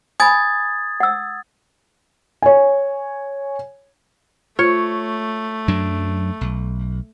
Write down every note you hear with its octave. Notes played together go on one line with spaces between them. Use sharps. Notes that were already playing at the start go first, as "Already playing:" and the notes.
G#5 B5 D#6 G#6 A6
F#5 E6
C#5 G#5
A3 F4 C#5
F#2 F#3 D4
B1